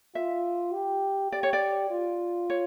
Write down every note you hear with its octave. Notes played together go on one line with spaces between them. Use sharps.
F4 E5
G4
G4 D5
C#5
D5
F4
C#5